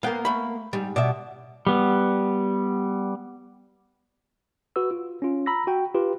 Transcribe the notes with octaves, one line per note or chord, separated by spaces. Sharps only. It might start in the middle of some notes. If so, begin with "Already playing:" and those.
A#3 B3 F5 G5
A3 B5
G#2 G3
B2 D5 E5
G3 B3
F#4 B4 E6
F4
C#4 F4
A#5 B5 E6 A#6
F#4 G5
F4 G4 B4